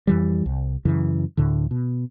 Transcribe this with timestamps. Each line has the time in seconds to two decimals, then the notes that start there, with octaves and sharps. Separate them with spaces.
0.07 F2 E3 G3
0.46 C2
0.85 F#2 C#3 E3
1.37 D2 A2 D3
1.71 B2